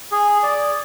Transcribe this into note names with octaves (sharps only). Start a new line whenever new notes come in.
G#4
D5